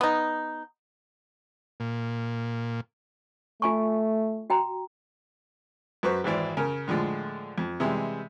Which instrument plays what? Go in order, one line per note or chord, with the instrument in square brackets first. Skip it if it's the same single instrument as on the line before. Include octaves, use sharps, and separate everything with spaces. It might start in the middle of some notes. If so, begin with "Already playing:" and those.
[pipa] B3 D#4
[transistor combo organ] A#2
[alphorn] A3 [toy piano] F4 G#5 C#6
[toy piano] F#4 G5 A#5
[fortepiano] F#2 F#4 B4 C5 C#6
G#1 G#2 E3 D5
C#3 A#4 G#5
A2 D3 F3 G#3
F2
C3 E3 G3 G#3